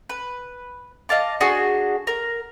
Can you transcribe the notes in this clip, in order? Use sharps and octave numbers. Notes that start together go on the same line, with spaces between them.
B4
D#5 F5 A5 D6
D4 F#4 G#4
A#4